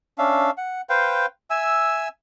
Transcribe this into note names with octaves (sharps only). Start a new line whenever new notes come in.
C#4 D4 E5 F5
F#5
B4 C5 F5 G5
E5 G#5 E6